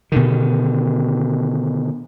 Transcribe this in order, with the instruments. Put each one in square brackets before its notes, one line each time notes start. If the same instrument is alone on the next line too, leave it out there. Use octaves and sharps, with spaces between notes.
[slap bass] B2 D3 D#3